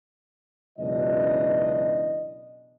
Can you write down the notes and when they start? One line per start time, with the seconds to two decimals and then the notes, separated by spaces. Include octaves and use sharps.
0.79 C#2 F#2 B2 E3 D4 D#5